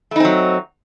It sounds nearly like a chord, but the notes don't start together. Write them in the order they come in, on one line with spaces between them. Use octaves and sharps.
A3 D#4 C4 F#3